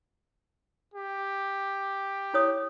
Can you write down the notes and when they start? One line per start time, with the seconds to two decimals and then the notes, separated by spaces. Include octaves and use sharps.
0.94 G4
2.34 E4 C#5 D#6